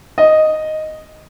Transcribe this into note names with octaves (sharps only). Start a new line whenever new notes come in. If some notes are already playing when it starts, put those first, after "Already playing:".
D#5